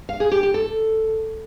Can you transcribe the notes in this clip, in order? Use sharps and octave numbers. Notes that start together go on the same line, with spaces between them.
F5
G#4
G4
G4
A4